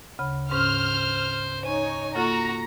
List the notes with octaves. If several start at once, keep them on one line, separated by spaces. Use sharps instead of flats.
D2 C#3 B5
G#2 C#4 C5 F6
D#4 C#5 G#5
A#3 F4 F#4 A4 A#5